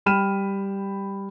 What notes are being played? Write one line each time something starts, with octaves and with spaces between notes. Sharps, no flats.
G3 G5 B5 F6 D#7 E7